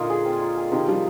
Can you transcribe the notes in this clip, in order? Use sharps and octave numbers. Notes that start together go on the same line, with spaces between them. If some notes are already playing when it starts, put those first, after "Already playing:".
Already playing: A#2 D3 D#4 F4
G#4
C4
F4
G#4
C3 D#3 C4
D#3 F3 G3